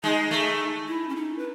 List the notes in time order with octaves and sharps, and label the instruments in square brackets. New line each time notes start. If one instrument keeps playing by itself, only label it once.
[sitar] G#3 [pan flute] D#4
[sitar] A3
[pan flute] E4
C#4
D#4
B4